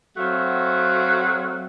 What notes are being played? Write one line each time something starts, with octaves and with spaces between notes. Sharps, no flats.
F#3 A3 C4 F#4 F5